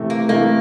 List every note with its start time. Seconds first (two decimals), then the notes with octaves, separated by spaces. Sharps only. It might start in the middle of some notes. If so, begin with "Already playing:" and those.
Already playing: C3 E3 A3
0.10 A#3
0.29 C3 E3 A3 A#3